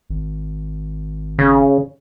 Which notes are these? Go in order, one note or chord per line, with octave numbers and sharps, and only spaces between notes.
G#1
C#3